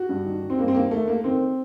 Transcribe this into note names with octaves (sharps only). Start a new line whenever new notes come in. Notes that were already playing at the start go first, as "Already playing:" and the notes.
Already playing: F#4
G2
D#3
D#3
C4
G2 A#3
C4
D#3 A#3
A3
A3 A#3
D#3 C4